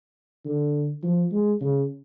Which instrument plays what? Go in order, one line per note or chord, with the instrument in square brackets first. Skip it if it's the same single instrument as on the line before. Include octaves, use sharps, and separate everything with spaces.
[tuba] D3
F3
G#3
C#3